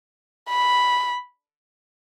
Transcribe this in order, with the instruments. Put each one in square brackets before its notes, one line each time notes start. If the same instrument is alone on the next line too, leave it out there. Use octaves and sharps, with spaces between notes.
[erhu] B5